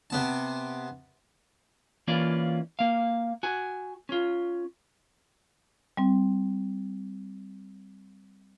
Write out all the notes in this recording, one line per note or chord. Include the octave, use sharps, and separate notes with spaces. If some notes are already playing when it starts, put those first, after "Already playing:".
C3 B3 A5
E3 A#3 C#4 F4 D5
A#3 F5
F#4 G#5
C#4 F4
G3 C4